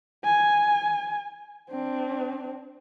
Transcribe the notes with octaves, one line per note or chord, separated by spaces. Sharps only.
G#5
C4 D4